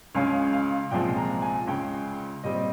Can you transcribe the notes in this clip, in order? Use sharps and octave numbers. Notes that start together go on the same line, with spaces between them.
C#2 C#3 G#3 C#4 F5
F5
C2 A#2 F3 G#3 G5
A#5
G#5
C#2 C#3 G#3 C#4 G5
A#2 G3 C4 D#5